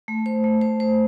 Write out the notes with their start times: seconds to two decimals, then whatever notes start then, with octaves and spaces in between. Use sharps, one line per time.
0.08 A3
0.26 C5
0.44 A3
0.61 C5
0.80 C5